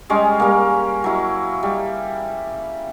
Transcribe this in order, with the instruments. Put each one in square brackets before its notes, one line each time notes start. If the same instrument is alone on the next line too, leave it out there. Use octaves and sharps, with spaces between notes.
[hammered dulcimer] G3 G#3 C#4 G#4
G3 A#3
F#3 E4
G3